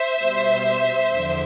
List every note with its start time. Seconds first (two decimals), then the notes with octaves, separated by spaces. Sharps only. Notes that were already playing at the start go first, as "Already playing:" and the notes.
Already playing: C5 E5
0.19 B2 G3
1.13 E2 D3 F3